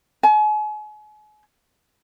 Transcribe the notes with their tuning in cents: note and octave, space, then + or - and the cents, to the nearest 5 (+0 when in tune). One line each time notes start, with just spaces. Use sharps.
G#5 +40